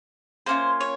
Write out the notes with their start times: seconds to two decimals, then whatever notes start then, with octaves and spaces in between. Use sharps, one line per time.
0.46 A#3 C#4 F4 C5
0.80 C#5